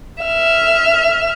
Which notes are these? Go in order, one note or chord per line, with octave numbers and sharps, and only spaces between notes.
E5 F6